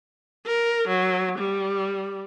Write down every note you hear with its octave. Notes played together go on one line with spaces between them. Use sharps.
A#4
F#3
G3